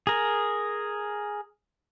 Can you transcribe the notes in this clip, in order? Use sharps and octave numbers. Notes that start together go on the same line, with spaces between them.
G#4 A#4